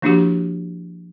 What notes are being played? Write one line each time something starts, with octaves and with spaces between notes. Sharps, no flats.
F3 A#3 D4 E4 F#4 G4